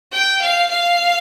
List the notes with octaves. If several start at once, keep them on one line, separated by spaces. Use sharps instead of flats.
G5
F5
F5